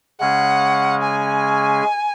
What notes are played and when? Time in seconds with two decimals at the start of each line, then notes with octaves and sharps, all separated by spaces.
0.20 C#3 G#3 C#4 G#4 F#5
1.02 G#5